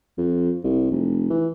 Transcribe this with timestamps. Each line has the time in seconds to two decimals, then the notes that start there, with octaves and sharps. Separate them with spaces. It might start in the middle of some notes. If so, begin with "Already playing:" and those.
0.18 F2
0.64 C2
0.91 F1
1.30 E3